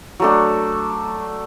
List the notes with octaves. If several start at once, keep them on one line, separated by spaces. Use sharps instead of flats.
F#3 A3 D4